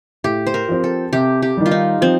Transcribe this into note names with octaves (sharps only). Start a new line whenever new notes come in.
A2 G4
C5
A#4
F3 C4
A4
C3 G4
G4
D#3 G3
F4
D#4
F3 C4